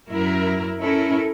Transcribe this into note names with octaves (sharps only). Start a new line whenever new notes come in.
F#2 E4 A#4
C#4 E4 A4 A#4